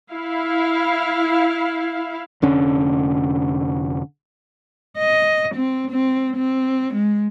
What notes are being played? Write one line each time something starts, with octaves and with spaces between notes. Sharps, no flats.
E4 F5
F1 D3 C#4
D#5
C4
C4
C4
G#3